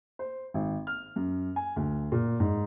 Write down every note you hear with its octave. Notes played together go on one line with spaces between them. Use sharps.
C5
G#1
F6
F#2
G#5
D2
A#2
G#2